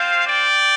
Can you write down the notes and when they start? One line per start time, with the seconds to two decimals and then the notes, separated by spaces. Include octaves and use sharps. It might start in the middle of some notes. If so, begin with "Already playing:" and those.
Already playing: C4 F4 C5 F5
0.26 D5 G5